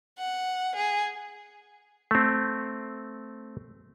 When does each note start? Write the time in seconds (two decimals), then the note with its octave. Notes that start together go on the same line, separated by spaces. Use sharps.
0.19 F#5
0.76 G#4
2.11 A3 C4